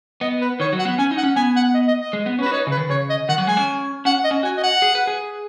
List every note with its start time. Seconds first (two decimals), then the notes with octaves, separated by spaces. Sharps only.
0.21 B3 D#5
0.41 B4
0.60 D#3 C#5
0.73 F#3
0.79 F#5
0.85 B3
0.99 C#4 G#5
1.11 D#4
1.17 F#5
1.24 C#4
1.36 B3 G#5
1.56 F#5
1.74 D#5
1.88 D#5
2.01 D#5
2.13 G#3
2.26 B3
2.39 C#4 B4
2.46 F#4
2.52 D#4 C#5
2.67 C#3 B4
2.77 D#3
2.89 C#3 C#5
3.10 D#5
3.29 D#3 F#5
3.38 F#3
3.47 G#3 G#5
3.57 C#4
4.05 C#4 F#5
4.24 D#5
4.31 C#4
4.43 F#4 G#5
4.57 D#5
4.63 F#5
4.82 G#4
4.95 B4
5.07 G#4